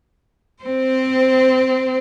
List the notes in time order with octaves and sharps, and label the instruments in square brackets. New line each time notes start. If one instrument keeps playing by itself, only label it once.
[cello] C4 C5